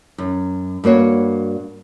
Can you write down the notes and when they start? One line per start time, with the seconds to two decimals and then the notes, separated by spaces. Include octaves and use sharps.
0.18 F#2
0.84 G2 A#3 F#4 C#5